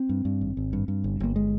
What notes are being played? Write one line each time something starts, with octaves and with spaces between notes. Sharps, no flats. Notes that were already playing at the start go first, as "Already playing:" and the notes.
Already playing: C4
G2
G2
G#1
G#1
G2
G2
G1
G1 A#3
G#3